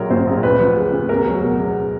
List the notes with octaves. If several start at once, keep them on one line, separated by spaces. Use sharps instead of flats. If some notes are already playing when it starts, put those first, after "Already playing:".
Already playing: A#1 F#3 A#4
A#2 C5
A#1
D2 B4
F3
C#3
D2
E2 A#4
F#3
B2
E2